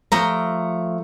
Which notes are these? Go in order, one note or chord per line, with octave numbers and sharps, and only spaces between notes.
F3 A3 A#5